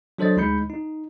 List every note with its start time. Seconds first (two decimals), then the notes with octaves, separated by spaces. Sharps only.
0.18 F#3 D4 A4 C5 D#5 A6
0.36 D2 G#3 D#4 B5 G6 C#7
0.70 D#4